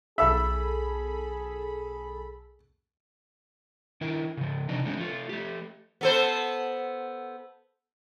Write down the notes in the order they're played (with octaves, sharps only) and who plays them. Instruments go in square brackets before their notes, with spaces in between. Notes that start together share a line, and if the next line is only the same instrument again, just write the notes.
[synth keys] B1 A4 B5 [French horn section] G#4 [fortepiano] E5 E6
[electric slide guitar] D#3 E4 A#4
C#3 F3
C3 D4 D#4
D3 F3 G#3 A3 C4 C#4
A3 F4
A3 G4
[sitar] B3 A4 C5